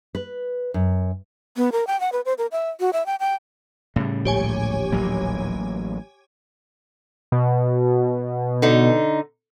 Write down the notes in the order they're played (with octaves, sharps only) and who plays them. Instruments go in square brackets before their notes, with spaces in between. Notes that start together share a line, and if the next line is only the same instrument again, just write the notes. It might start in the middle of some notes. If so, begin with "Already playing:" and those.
[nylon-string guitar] B4
F#2
[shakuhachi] B3
A#4
G5
F#5
B4
C5
A#4
E5
F#4
E5
G5
G5
[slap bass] A2 G3 [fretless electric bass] C#3
[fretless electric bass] D1 A#1 [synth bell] G4 C#5 G#5
[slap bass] A1 F#3 A#3
[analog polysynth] B2
[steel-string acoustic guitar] D3 D#4